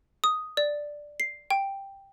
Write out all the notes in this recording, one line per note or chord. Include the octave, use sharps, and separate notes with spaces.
D#6
D5
C7
G5